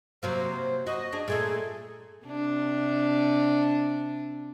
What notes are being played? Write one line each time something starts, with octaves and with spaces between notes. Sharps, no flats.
C3 F#3 A#3 C5
F#4 D#5
D4 G#4
A#2 A3 G#4 A4
C3 D4